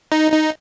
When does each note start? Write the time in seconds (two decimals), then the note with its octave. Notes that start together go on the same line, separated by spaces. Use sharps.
0.12 D#4
0.32 D#4